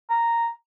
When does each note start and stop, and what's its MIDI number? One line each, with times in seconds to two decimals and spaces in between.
0.10 0.50 82